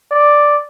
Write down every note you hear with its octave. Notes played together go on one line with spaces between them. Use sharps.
D5